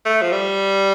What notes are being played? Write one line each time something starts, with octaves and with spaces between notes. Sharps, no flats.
A3
F3
G3